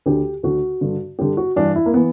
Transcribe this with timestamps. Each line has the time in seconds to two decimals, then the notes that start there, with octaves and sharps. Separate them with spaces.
0.06 D2 D3 G4
0.43 D2 D3 F#4
0.81 G2 D3
1.19 G2 D3 G4
1.37 F#4
1.56 G2 E3 D4
1.75 E4
1.86 A#3
1.94 E3 B3